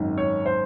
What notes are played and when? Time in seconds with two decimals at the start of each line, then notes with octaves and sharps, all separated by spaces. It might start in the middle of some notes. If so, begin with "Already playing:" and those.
Already playing: G#1 F#2 D#3
0.18 C#5
0.46 C5